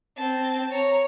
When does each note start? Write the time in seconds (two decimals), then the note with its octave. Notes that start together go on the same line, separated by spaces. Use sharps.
0.17 C4 A5
0.71 C#5 A#5